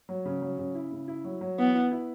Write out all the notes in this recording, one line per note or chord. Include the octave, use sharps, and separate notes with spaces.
F#3
C#3
F#3
C#3
E4
C#3
E4
F#3
F#3
E3 B3
E4
E4